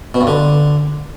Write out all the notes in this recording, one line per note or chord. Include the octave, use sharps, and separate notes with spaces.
B2
G2
D3